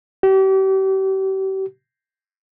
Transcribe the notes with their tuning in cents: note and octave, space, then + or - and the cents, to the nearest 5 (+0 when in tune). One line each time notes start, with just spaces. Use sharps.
G4 -35